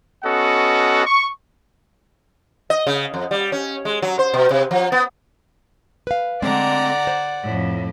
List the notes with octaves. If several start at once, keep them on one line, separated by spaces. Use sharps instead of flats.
B3 C#4 F#4 A4 D#5 F#5
C#6
D#5
C#3
F2
G3
C#4
G#3
F#3
C5
B2
C3
F3
B3
B4 F5
D3 G#3 A3 C4 D5 F#5 A#5
C5
F2 A2